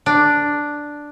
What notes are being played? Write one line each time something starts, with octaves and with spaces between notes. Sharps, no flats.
D4